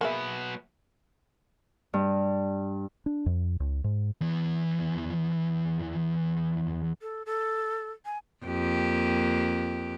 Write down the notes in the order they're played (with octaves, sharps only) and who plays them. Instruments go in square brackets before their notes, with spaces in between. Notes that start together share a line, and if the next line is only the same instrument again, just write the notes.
[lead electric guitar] F#3 B3 [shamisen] A#3 G#4 E5
[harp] G2
[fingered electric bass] D4
F2
C#2
G#2
[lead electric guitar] E2 E3
[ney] A4
A4
G#5
[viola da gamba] F2 A#3 G4